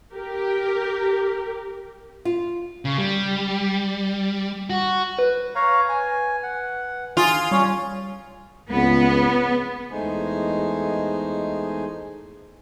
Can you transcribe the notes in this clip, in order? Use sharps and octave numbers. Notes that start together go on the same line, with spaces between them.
G4 A#4
F4
C#3
G3
F#4
B4
C#5 F5 A#5
G#5
F#5
F4 G#4
G3 C#4 C#5
C#2 B3
E2 G#3 A3 D#4 C5 G#5